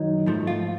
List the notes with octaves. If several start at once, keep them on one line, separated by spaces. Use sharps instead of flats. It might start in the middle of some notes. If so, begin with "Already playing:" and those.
Already playing: F#2 D#3 F#3 D#4
G#2 F3 A3
F4